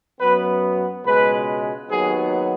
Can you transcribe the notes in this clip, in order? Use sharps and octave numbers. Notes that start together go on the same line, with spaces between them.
F#2 F#3 B3 B4
C#2 B2 G#3 B4
D#2 D#3 F#3 B3 G#4